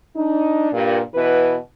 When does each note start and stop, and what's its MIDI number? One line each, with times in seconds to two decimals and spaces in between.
0.17 0.70 62
0.17 0.70 63
0.72 0.99 43
0.72 0.99 46
1.14 1.56 47
1.14 1.56 52
1.14 1.56 71